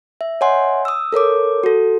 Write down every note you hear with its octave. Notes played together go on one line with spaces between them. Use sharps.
E5
C#5 D#5 E5 F#5 G#5 C6
D#6 E6
A4 A#4 C#5 D6
F#4 A4